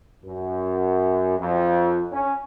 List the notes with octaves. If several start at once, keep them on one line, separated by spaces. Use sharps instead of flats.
F#2
F2
C#4